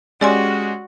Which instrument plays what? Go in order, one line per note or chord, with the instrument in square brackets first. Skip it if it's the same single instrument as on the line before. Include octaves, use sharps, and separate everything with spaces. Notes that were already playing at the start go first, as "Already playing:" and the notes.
[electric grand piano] G#3 C#4 G4 [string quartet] F#4 [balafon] D5 G#5 C6